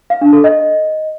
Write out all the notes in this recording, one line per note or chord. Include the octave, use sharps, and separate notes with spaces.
F5
D4
A4
D#5